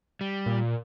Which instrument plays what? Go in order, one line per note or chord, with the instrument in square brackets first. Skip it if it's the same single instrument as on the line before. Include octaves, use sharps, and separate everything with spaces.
[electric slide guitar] G3
[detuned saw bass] A#2